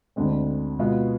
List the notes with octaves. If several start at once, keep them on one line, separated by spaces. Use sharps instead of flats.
D2 D3 G#3 C4
B2 G#3 B3 F4